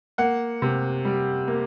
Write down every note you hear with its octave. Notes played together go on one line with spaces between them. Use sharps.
A#3 F#5
C3
G3
A#3